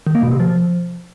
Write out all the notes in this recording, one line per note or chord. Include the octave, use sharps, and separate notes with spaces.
D#3
A#3
B2
C3
F3